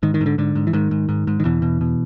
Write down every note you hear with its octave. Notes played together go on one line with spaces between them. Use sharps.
G#2 D#3
D#3
G#2
D3
G#2 D3
G#2
E3
G#2 D#3
G#2
G#2
G#2
D#3
E2 B2 E3
B2
B2